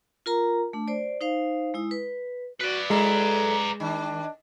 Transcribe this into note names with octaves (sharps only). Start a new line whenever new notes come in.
F4 A#4 A#5
A3 D4
C5 D5
D#4 C5 F5
G#3 E4 D#6
B4
F#4 B4 D5
F#3 G#3 E4 A4 A#5
D#3 D4